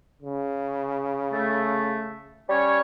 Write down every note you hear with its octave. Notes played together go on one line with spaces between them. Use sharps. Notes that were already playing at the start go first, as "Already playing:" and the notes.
C#3
A3
G3 C#4 C#5